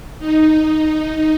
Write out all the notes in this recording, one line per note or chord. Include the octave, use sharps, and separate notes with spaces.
D#4